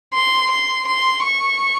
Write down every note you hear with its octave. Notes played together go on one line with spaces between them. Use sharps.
C6
C6
C6
C#6